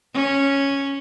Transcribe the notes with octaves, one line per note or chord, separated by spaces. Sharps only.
C#4